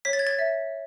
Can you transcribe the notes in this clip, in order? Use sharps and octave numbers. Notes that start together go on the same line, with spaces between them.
C#5 B6
A6
G#6
A6
E5